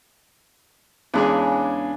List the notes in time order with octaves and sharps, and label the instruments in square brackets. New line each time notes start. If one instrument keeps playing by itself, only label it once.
[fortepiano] E2 G#3 G#4 [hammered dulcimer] C#3 D4